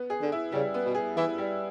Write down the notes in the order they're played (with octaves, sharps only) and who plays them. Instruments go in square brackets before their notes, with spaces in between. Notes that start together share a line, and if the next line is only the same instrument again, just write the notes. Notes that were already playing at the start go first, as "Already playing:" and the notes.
Already playing: [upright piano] B3
G#4
[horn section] D3
[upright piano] E4
[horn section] C#3 [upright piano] G3
[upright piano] B3
[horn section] B2
[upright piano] G#4
[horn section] E3 [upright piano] E4
[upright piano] G3